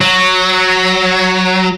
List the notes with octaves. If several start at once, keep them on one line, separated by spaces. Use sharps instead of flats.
F#3